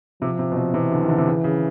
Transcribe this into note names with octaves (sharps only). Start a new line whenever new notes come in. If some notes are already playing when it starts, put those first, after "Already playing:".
C3 F3
C3
B2
C3
C3 E3
D3
D#3
D3
C3
C#3
C#3